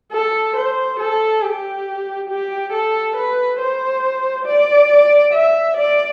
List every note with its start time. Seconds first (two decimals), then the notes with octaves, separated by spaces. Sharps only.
0.13 A4
0.56 C5
1.00 A4
1.42 G4
2.29 G4
2.73 A4
3.17 B4
3.60 C5
4.46 D5
5.34 E5
5.78 D5